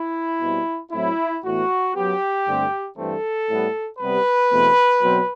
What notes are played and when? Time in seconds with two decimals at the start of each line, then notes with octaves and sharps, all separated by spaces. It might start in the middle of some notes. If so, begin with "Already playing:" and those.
Already playing: E4
0.41 B2 G3 C4
0.91 A2 F#3 C4 E4
1.44 A2 E3 B3 F#4
1.95 F#2 F#3 B3 G4
2.46 G2 D3 A3 C4
2.97 G2 E3 A3 C4 A4
3.48 A2 G3 B3
3.99 C3 G3 B3 B4
4.51 E2 B2 A3 C4
5.02 B2 F#3 C4